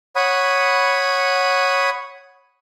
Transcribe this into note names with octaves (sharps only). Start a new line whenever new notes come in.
C#5 F#5 B5 D#6